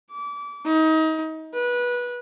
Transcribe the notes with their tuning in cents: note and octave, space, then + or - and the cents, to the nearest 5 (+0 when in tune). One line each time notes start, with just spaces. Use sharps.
D6 -30
D#4 +30
B4 -20